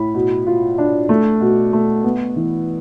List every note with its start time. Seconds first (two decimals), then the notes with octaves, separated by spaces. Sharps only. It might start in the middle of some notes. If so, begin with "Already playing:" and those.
Already playing: A2 B5
0.14 B2
0.47 F4
0.78 D4
1.09 A3
1.41 B2
1.73 A3
2.04 B3
2.36 E3